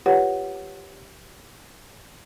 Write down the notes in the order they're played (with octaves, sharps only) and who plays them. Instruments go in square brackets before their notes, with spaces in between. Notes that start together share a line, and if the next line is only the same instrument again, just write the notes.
[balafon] F4 G4 B4 C#5 F#5